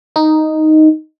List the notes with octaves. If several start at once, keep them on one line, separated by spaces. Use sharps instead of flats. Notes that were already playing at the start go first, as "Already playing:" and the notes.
D#4